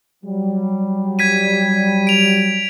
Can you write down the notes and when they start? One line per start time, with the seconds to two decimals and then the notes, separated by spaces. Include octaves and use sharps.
0.24 F#3 G3
1.19 G#6 B6 D#7
2.07 D7 F7